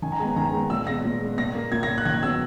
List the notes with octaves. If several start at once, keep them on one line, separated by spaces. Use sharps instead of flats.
D#3 G#5
A#5
G#3 B3 G#5
D#3 A#5
G#3 B3
A#2 E6
G#3 B3 A#6
A#2
G#3 B3
A#2 A#6
A#3
A#2 G#6
A#6
A#3
F#6
D#3 G#6
F#3 B3 E6